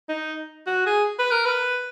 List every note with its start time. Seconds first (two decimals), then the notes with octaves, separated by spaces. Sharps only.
0.09 D#4
0.67 F#4
0.86 G#4
1.19 B4
1.31 A#4
1.45 B4